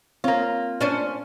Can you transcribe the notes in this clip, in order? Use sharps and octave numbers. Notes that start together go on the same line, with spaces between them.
A#3 C4 F4 C#5
C#4 D4 C5